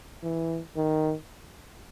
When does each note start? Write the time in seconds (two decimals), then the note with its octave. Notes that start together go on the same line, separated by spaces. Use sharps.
0.23 E3
0.76 D#3